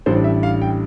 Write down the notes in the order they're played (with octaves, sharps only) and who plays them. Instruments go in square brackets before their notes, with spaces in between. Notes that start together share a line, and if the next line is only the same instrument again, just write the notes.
[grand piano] A1 A2 G3 D4 C5
E5
F5
G5